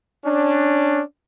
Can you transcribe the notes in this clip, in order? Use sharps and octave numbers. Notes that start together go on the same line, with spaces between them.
C#4 D4